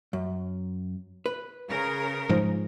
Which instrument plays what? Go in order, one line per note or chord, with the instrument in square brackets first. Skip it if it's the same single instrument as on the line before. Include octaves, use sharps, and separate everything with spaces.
[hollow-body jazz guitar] F#2
B4
[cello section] C#3 A#4
[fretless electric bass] G#2 F3 G#3